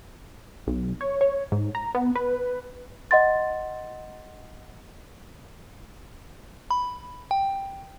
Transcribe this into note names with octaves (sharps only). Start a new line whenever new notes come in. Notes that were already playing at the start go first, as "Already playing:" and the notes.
B1
C#5
C#5
G#2
A#5
B3
B4
D#5 F#5 C6 A6
B5
G5